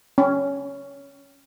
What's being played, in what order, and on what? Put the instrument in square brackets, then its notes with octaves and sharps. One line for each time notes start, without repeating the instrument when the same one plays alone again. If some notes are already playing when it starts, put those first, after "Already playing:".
[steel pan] C#4